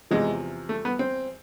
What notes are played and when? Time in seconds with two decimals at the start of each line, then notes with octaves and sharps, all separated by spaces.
0.11 E2 C3 F3 G#3
0.69 A3
0.85 B3
0.99 C4